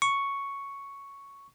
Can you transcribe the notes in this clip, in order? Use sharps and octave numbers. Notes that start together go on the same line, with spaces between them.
C#6